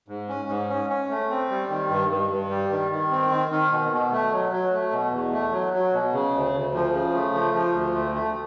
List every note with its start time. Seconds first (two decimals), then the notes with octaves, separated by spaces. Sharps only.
0.08 G#2
0.29 C#4
0.49 G#2
0.69 C#4
0.90 C#4
1.09 A3
1.30 C4
1.50 G3
1.70 D#3
1.90 G2
2.10 G2
2.30 G2
2.50 G3
2.70 D#3
2.91 D#3
3.11 C4
3.30 D#3
3.51 D#3
3.72 B2
3.92 B2
4.12 A3
4.32 F#3
4.52 F#3
4.73 A3
4.92 B2
5.12 E2
5.32 A3
5.52 F#3
5.73 F#3
5.93 B2
6.13 C#3
6.34 D2
6.54 D2
6.74 F3
6.93 C#3
7.14 A3
7.34 F3
7.54 F3
7.74 D2
7.95 A3
8.15 A3